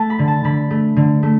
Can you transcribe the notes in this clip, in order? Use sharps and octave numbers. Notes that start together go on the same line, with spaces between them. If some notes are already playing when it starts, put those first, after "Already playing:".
Already playing: A3 A5
B5
D3
A5
D3 B5
A3
D3
A3